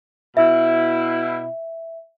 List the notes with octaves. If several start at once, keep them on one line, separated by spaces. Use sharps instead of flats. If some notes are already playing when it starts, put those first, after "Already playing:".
B2 E4 E5